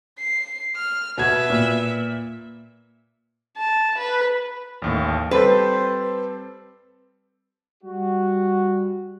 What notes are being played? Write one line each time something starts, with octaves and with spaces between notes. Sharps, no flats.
C7
F6
B2 B4 E5 G#6
A#2
A5
B4
A1 D#2 A2
G3 C4 A4 B4 C5
G3 F#4